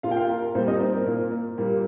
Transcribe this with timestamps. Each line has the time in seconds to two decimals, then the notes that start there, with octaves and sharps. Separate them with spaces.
0.03 A#2 A#3 F4 F5
0.11 G5
0.16 F4 F5
0.29 A#4
0.42 A#4
0.55 A#2 G3 A#3 C4 C5
0.68 D#4 D#5
0.80 C4 C5
0.93 A#4
1.06 A#2 A#3
1.58 A#2 G3 A#3